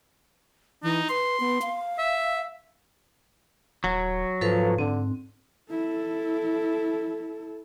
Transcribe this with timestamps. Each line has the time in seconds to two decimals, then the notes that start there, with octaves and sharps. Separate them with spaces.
0.83 E3 D#4
1.09 B4 C6
1.40 B3
1.62 F5
1.98 E5
3.84 D#1 F#3
4.41 G#2 F3 A4 B4 F5
4.79 G#2 D3 C4
5.70 E4 A4